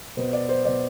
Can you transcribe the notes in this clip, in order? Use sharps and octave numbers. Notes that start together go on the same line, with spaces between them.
B2 B3 C5
D5
C5
B2 B3 D5